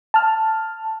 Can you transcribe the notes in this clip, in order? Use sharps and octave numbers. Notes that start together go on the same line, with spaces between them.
A5 F6